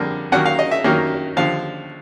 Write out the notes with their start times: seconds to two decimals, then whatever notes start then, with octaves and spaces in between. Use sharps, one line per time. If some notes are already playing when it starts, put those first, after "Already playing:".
Already playing: F2 D3 G3 A#3
0.32 D#2 D#3 F#3 A#3 C#4 F#5
0.46 F5
0.59 D#5
0.71 E5
0.84 D#2 D#3 F#3 A#3 C#4
1.37 D#2 D3 F3 F5